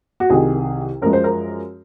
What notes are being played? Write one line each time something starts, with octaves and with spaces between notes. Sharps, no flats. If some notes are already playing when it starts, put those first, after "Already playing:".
F#4
C2 C3 D#3 G#4
F#2 F3 G#3 A#4
C5
A#4